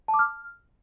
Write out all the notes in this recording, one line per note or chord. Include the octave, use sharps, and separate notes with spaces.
A5
D6
F6